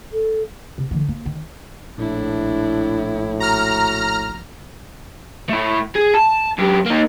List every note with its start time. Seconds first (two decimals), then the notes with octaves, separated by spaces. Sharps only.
0.12 A4
0.78 C3
0.91 D3 E3
1.08 A#3
1.26 D#3
1.98 A#1 A2 D4 E4
3.40 F#4 A#5 F6
5.49 A3 E4
5.95 G#4
6.14 A5
6.58 F#2 G4
6.86 A#3 D#4